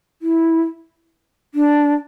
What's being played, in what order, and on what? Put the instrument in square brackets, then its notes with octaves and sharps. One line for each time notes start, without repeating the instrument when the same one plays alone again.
[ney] E4
D4